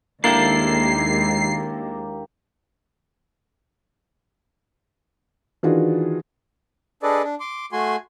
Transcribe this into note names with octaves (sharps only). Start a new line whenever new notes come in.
D#2 G#3 A#3 D4 E4 G4 A4 C7
D#3 E3 D4 F4 F#4 G#4
D4 G#4 A4 B4 D5 D#5
D4
C6 D6
A3 F#4 G#5 C6